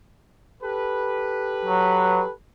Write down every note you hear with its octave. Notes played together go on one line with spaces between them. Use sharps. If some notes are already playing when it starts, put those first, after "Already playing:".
G4 A4 B4
F#3